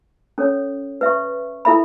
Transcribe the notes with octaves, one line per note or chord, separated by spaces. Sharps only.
C#4 A4 C#5
B4 E5 C#6
E4 A4 E5 B5